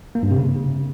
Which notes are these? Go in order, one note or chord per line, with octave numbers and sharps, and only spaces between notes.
A#3
G2
C3
C#3